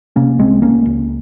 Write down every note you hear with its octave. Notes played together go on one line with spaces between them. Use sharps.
C3 A#3 C#4
C2 G#3 C4
C2 A#3 C#4
C#2